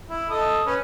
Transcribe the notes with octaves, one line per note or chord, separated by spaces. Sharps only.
E4
A4 D#5 D#6
C#4 B4